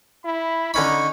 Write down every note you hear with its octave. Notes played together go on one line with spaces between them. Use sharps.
E4 B5
D3 C#4 D#4 B5 C#6